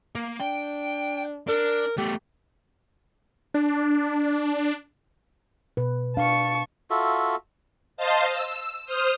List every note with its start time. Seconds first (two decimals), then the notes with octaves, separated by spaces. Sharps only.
0.15 A#3
0.40 D4 G5
1.48 D4 A#4
1.98 A3 B3 G4
3.54 D4
5.77 B2 B4
6.17 D4 F5 A5 C#6
6.90 F4 F#4 A4 E5
7.97 C5 D#5 F5 A5 C6
8.30 E6
8.86 C5 D#6 F6